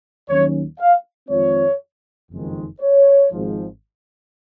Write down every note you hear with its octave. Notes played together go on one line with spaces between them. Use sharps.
D#2 D#3 F#3 C#4 C#5
F5
F2 D#3 G#3 C4 F4 C#5
F#1 F2 D#3 G#3
C#5
G#1 G#2 F3